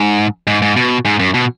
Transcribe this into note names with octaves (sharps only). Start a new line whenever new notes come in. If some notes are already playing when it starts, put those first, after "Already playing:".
Already playing: G#2
G#2
G#2
B2
G#2
F#2
B2